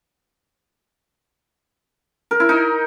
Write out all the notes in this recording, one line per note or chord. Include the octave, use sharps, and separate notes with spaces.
A#4
E4
D#4